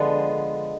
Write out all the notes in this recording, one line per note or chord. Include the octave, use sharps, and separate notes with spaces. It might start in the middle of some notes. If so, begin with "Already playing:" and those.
Already playing: D3 F3 G#3 B3